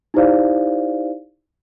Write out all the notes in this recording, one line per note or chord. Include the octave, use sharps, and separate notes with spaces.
D#4 E4 G4 C5 D5 F5